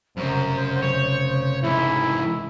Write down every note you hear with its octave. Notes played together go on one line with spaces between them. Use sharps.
F1 F#2 C#3 C5
C#5
G#2 E3 E4